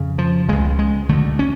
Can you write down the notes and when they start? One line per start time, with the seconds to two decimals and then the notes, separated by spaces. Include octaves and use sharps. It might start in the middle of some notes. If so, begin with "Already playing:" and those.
Already playing: F2 C#3
0.18 F3
0.49 C#2 C#3 G#3
0.79 G#3
1.09 D2 D3 A3
1.39 C#4